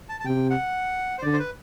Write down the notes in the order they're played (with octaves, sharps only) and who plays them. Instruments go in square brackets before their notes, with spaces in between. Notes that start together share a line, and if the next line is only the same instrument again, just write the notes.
[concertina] A5
A5
[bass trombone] C3 [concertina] G5
[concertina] F#5
C5
[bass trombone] D3 [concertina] D5
[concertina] C5
B4